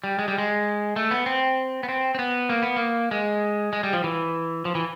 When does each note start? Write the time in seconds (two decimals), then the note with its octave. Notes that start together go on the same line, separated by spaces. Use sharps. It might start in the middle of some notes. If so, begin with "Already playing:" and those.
0.04 G3
0.19 G#3
0.28 G3
0.38 G#3
0.96 A3
1.11 B3
1.26 C4
1.83 B3
1.89 C4
2.15 C4
2.19 B3
2.49 A#3
2.63 B3
2.76 A#3
3.11 G#3
3.73 G#3
3.83 G3
3.93 F3
4.04 E3
4.65 F3
4.75 E3